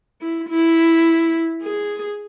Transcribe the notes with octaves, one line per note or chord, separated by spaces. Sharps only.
E4
E4
G#4